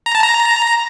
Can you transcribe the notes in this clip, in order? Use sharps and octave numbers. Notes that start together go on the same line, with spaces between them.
A#5
A5
A#5